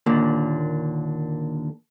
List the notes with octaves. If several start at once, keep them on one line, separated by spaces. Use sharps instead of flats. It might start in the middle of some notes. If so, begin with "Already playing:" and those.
D#2 A#2 D3